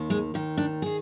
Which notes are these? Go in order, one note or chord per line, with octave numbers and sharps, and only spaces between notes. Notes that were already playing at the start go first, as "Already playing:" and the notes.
Already playing: D#2 D#3
G#3
D#2 D#3
D4
D#3 G#4